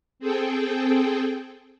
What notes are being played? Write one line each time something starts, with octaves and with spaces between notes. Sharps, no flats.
C4 G#4 A4 G5